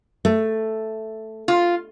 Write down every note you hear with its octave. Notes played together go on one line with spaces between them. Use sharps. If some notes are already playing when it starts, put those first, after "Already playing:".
A3
F4